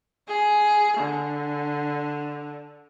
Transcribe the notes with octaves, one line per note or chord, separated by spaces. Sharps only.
G#4
D3